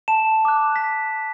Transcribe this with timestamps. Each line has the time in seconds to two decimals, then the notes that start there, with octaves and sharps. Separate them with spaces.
0.08 A5 E7
0.45 D6 F#6
0.76 B6